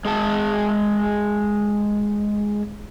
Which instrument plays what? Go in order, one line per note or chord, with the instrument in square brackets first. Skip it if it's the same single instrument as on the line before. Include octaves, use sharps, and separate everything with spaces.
[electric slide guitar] G#3 G#4 A5